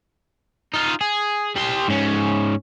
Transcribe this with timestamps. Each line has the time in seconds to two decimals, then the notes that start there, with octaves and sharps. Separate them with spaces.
0.74 D#4 F4
1.01 G#4
1.56 G3 C6
1.88 G#2 C#4